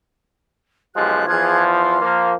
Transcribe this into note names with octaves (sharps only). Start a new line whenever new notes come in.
B1 F3 G#3 G4 F#6
E2 F3 G#4 F#6 G#6
F4 C6
F3 A#3